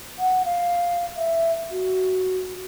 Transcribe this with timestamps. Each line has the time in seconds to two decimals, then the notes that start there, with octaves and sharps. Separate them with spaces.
0.19 F#5
0.45 F5
1.17 E5
1.71 F#4